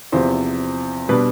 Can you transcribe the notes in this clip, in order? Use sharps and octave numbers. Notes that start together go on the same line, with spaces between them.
E2 C3 F3 C5
B2 G3 D4 B4